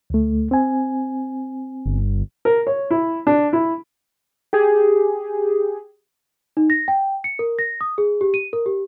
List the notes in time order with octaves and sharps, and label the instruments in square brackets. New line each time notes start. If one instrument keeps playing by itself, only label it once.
[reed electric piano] D2 A3
C4 G#5
[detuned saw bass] G1
[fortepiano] A#4
C#5
E4
D4
E4
[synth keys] G4 G#4
[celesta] D#4
A#6
G5
C#7
A#4
A#6
D#6
G#4
G4
D#7
A#4
G4